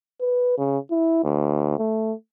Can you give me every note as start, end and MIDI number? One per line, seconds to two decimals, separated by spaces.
0.21 0.56 71
0.58 0.78 49
0.91 1.22 64
1.24 1.77 38
1.78 2.13 57